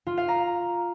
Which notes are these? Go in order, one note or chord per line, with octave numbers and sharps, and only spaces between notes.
F4
F5
A#5